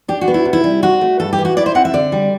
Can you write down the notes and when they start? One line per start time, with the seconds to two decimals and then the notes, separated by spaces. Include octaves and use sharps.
0.08 D4 G4
0.21 F#4
0.28 B3
0.34 E4
0.45 C3
0.53 E4
0.64 G3
0.82 C4 F#4
1.01 A3
1.20 G2 A4
1.33 G4
1.39 E3
1.45 F#4
1.57 E4 D5
1.66 C5
1.75 C4 F#5
1.85 E5
1.94 D3 D5
2.12 G3